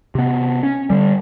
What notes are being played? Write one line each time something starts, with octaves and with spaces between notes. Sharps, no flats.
C3 B3
C#4
D3 G3